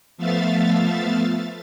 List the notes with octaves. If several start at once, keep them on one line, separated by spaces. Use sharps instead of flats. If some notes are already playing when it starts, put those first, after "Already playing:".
F3 A3 B3 E5 F5 A6